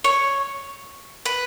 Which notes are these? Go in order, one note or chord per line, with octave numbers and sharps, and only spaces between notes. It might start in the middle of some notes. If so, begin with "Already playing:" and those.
C#5
B4